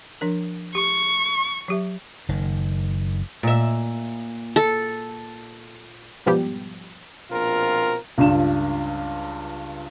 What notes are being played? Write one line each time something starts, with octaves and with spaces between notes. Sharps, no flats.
F3 D4 A#4
G4 C#6
F#3 G4 E5
F#1 D#3
A#2 E5
A4
G#2 B2 F3 G3 B3 G4
A#1 B2 C4 F4 A#4
C#2 G2 F4 E7